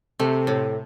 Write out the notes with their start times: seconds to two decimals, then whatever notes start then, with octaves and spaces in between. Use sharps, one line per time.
0.19 C3 A3
0.47 A2